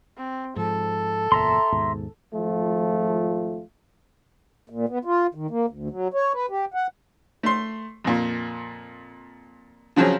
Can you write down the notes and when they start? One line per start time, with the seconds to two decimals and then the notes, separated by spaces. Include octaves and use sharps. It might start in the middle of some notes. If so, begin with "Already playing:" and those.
0.17 C4
0.56 G#2 F3 A4
1.32 F#1 E2 A#2 E5 A#5 C6
1.72 D#2 G#2 B2
2.34 G#1 F3 A3 F4
4.70 A#2
4.89 B3
5.05 F4
5.35 D#3
5.51 A#3
5.69 D2
5.90 F#3
6.14 C#5
6.34 B4
6.50 G4
6.74 F#5
7.43 A3 C6
8.04 F2 A#2
9.96 C#3 F3 F#3 C4 G#4